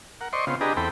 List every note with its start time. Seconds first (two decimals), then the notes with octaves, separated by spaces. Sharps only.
0.21 A#4 F#5
0.33 C5 D5 D#5 C6 C#6
0.47 C#3 B3 C4 F4
0.61 D4 G4 G#4 B4 D#5 A#5
0.77 E2 C4 A4 G5 B5